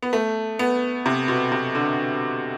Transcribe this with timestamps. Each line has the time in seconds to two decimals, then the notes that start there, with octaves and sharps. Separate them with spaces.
0.02 B3
0.13 A3
0.59 B3
1.06 C3
1.28 B2
1.52 C3
1.75 D3